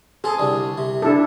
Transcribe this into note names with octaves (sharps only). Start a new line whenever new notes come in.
C4 G#4 A4
C2 D3
C3
D4 E4 A4